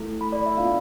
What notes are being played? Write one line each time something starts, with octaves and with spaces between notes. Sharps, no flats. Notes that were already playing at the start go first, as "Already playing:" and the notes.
Already playing: A3 E4 A4
B5
D5
E5
B3 D4 F4 F5